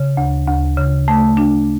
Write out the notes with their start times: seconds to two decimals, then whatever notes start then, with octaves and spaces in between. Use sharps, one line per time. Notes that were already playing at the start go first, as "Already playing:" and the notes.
Already playing: C#3
0.17 D2
0.48 D2
0.77 C#3
1.08 A3
1.37 D4